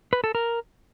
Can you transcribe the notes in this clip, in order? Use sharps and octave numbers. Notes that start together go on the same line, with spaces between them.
B4
A4
A#4